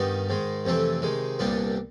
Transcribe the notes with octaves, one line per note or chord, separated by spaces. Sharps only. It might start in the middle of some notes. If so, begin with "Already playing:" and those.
Already playing: G2 D#3 G3 B3 D#4
G#2 D#3 G#3
F2 C3 E3 A3 C4
C3 D#3 G#3
C2 A#2 G3 B3 D4